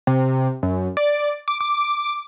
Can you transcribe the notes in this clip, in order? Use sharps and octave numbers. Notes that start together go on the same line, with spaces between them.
C3
F#2
D5
D6
D6